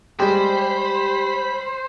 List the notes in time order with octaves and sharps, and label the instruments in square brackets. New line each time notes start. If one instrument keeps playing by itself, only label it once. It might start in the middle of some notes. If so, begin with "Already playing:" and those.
[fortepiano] G3 G#3 [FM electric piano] G4 [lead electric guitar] C5 [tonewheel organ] B5